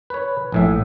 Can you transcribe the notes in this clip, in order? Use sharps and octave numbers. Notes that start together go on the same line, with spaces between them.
B4 C#5
A#1 A2 E5